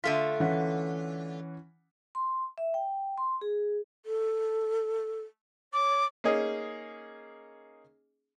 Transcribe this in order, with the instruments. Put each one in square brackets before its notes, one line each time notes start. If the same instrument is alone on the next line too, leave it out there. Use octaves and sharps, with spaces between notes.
[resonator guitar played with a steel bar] D3 A3 F4 [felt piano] B6
[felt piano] E3 C#4 F#5
[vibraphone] C6
E5
G5
C6
G#4
[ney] A4
[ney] C#5 [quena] D6
[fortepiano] A#3 C#4 D#4 G#4 D#5